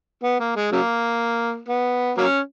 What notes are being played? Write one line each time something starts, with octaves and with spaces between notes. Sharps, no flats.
B3
A#3
G#3
C#3 F#3 A#3
B3
F#3 A#3 C#4